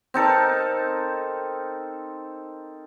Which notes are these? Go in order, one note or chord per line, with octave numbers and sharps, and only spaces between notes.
C4 D#4 A4 A#4